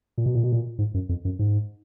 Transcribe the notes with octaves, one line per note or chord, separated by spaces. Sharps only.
A#2
B2
A#2
B2
A#2
G#2
F#2
F2
F#2
G#2